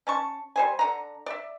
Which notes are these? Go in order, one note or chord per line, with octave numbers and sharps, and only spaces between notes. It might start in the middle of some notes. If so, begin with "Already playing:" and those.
C#4 A5 C#6
G3 C5 G#5
D3 A#5
D5 E5